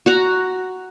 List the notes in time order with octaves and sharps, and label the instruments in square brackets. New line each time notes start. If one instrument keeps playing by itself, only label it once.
[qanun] F#4 F#5 A#5